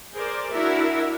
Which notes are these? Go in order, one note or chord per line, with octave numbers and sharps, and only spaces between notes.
G#4 A#4 C5 D5
D4 E4 F#4 A#4 E5